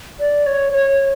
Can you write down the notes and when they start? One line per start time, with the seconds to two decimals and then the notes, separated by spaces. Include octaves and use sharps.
0.20 D5
0.46 C#5
0.73 C#5